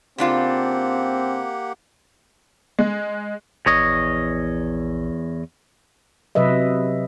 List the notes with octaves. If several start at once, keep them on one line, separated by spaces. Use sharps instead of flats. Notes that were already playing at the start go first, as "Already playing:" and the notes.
C#3 A#3 C4 D4 F4 G4 F#5
G#3
A#1 E2 C#5 D#5
C3 F#3 B4 D#5 E5